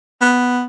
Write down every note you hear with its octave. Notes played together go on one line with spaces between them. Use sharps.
B3